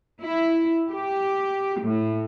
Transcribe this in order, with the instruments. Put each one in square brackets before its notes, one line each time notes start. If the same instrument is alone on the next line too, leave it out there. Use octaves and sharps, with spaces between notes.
[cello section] E4
G4
A2